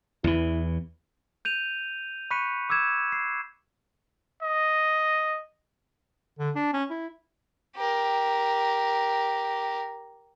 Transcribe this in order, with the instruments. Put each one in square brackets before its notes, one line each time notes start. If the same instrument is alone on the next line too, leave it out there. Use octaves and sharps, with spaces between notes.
[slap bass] E2 E3 [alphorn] E4
[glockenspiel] G6 D#7 F7
B5 C#6 F#6 B6 C#7 D#7
D6 E6 G6 G#6 E7
C7
[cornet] D#5
[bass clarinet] D3
D4
C#4
E4
[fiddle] G4 A#4